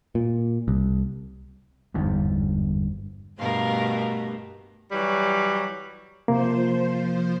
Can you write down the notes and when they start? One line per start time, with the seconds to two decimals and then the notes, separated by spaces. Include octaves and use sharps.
0.15 A#2
0.68 C2
1.94 G1 E2 G#2
3.39 G2 B2 A3 A#4 F5
4.92 E3 F#3 G3
6.28 C3 F3 A#3 C5